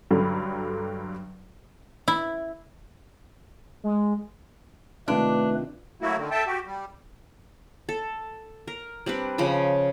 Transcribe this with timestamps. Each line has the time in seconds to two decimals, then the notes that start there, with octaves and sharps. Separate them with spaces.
0.11 G2 D3 F#3 G3
2.08 E4
3.84 G#3
5.08 C3 D#3 A3 D4 F4 B4
6.02 F#3 A3 A#3 E4 F#4
6.17 D3 D#3
6.31 A4 E5 G5 A5
6.47 F#4 G4
6.66 G3
7.89 A4
8.67 A#4
9.06 G3 C4 D4 B4
9.38 C#3 F3 D#5 B5